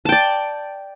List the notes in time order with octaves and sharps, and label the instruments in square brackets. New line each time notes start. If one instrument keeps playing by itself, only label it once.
[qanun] A5
G5
D5